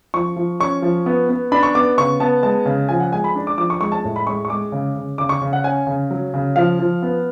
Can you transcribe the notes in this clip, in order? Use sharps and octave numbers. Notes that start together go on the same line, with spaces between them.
F3 C#6
F3
C#4 C#6
F3
B3
B3
D4 B5
C#6
B3 D6
C#3 C#6
B3 A5
G#3 A5
C#3
F3 G#5
F#5
G#3 G#5
B5
D4
D6
F3 D6
C#6
G#3 C#6
A5
A2
B5
G#3 C#6
C#6
G#3 D6
C#3
C#3
C#3 D6
C#6
C#3
F#5
C#4 G#5
C#3
F#3
C#3
F3 F5
F3
B3